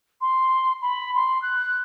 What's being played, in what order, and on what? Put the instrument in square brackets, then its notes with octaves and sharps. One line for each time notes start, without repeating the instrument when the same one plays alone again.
[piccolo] C6
B5
C6
F#6